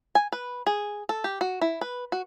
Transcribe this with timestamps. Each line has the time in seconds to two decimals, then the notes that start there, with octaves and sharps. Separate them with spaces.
0.15 G#5
0.32 B4
0.66 G#4
1.09 A4
1.24 G4
1.41 F#4
1.61 E4
1.81 B4
2.12 F#4